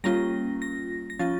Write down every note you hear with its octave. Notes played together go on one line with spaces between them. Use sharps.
G3 A#3 C#4 F4 A#6
A#6
A#6
F3 C#4 F4 A6